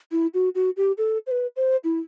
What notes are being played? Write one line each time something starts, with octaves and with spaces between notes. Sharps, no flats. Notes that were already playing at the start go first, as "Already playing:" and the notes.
E4
F#4
F#4
G4
A4
C5
B4
C5
E4